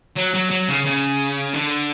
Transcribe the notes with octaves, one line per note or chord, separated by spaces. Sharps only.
F#3
F#3
F#3
C#3
C#3
D3